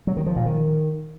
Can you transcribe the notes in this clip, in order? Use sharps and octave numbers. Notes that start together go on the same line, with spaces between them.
F#3
D#3
F3
A#2
D#3